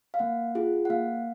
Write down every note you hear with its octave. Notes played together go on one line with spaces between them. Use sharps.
F5
A#3 F#5
F4 G#4
F#5
A#3 F5